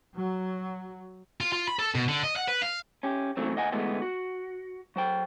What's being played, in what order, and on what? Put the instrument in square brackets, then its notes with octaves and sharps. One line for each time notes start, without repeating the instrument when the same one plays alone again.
[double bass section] F#3
[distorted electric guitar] F4
F4
B5
A4
B2
D3
D#5
F#5
B4
F5
[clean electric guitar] C#4 G4
A#2 E3 F#3 A3 C4
D2 D#5 F#5 G#5
D2 E3 G#3 A3 B3 D#5
F#4
F#3 C5 G5